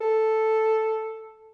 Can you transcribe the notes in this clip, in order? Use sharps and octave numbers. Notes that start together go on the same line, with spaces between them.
A4